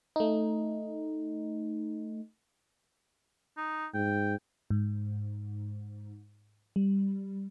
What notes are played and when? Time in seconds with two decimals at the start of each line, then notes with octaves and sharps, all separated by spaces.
0.16 A3 D#4
3.57 D#4
3.94 G#2 G5
4.70 G#2
6.76 G3